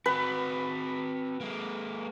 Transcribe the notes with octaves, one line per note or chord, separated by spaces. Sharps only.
C4 F#4 B4
G#3 A#3